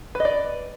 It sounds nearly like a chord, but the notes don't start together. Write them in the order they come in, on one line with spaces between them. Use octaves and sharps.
B4 D#5 D5